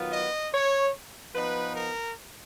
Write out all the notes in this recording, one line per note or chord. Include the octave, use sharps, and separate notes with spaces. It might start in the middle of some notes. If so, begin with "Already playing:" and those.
Already playing: D#3 F#3 B3 F4
D#5
C#5
F3 B3 D#4 B4
A#4